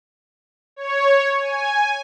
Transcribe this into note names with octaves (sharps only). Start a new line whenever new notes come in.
C#5
G#5